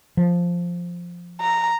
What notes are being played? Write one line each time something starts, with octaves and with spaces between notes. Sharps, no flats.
F3
A#5